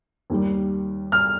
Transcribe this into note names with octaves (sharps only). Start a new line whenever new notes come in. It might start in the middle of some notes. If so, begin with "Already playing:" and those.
D#2 D#3 G3
F6